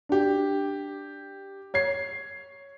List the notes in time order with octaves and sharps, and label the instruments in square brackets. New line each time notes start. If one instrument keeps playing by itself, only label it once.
[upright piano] D4 G4
C#5 G#6 C7